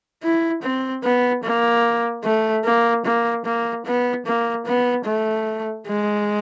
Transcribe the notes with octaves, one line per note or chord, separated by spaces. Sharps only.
E4
C4
B3
A#3
A3
A#3
A#3
A#3
B3
A#3
B3
A3
G#3